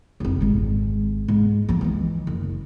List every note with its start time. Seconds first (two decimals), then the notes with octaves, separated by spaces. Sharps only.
0.20 F1 C2
0.41 G#1 G#2
1.28 G#2
1.69 F3 A#3
1.81 D#3 E3
2.27 F#1